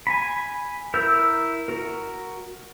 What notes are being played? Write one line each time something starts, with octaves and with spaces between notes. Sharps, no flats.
G#5 B5
E4 A#4 E6 G6
F#4 A#4